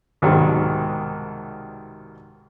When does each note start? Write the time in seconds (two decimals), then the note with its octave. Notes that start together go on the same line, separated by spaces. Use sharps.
0.22 C2 G#2 B2 D#3 G3 G#3